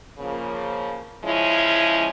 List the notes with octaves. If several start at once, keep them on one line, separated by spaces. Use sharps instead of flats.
C#3 F3 A#3
C#3 F3 G#3 C#4 E4